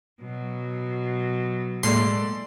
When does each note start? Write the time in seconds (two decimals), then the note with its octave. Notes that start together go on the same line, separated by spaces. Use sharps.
0.21 B2 F#3
1.83 A2 G#3 A#3 A4 D5 C6